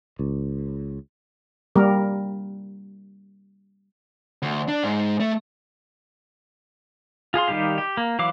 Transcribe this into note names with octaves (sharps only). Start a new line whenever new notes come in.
C#2
G3 A#3 A#4
D2
D4
G#2
A3
F4 G#4 F5 C6
D#3 G3 D#4 G4 F5
G4
A#3
E3 F#3 F5 D6